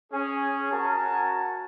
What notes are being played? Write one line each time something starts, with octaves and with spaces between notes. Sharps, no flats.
C#4 G#4
F#4 A#4 G#5 A5